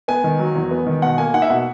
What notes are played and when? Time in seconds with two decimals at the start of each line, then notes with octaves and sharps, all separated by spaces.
0.08 B3 G#5
0.24 D#3
0.39 F#3
0.55 E2
0.71 B3
0.86 D#3
1.02 B2 F#5
1.18 A#3 G#5
1.34 D#4 F#5
1.42 E5
1.50 B2 F#5